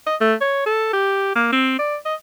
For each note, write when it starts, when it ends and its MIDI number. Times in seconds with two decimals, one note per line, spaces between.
0.07 0.16 75
0.21 0.34 57
0.41 0.64 73
0.66 0.88 69
0.93 1.33 67
1.35 1.51 58
1.53 1.76 60
1.79 1.96 74
2.06 2.15 75